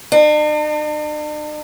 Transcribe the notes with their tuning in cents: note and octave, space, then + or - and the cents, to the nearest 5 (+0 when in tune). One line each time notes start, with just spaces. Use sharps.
D4 +45